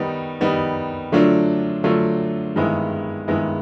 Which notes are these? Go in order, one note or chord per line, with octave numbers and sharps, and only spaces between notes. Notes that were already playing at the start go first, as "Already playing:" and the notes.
Already playing: D#3 G3 B3 D#4
D#3 G3 B3 D#4
D3 F#3 A3 D4 F4
D3 F#3 A3 D4 F4
G2 D#3 G#3 B3 E4
G2 D#3 G#3 B3 E4